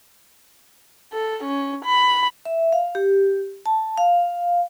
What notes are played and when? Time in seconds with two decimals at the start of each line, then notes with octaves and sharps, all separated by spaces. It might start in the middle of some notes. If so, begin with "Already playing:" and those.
1.13 A4
1.44 C#4
1.85 B5
2.45 E5
2.72 F5
2.95 G4
3.66 A5
3.98 F5